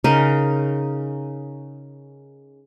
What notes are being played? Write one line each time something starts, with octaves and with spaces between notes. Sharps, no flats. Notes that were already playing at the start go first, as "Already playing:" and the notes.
C#3 D#4 A#4 D#5